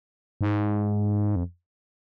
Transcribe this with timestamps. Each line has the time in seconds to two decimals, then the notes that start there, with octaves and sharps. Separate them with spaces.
0.41 G#2
1.36 F2